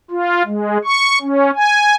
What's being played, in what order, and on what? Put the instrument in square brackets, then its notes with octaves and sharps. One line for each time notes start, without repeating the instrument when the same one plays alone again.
[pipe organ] F4
G#3
C#6
C#4
G#5